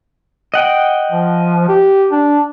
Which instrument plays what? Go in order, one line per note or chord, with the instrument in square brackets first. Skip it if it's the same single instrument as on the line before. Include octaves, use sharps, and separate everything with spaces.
[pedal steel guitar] D#5 F#5 G5
[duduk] F3
G4
D4